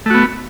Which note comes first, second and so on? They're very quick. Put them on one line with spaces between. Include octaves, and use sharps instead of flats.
A3 F#4 B3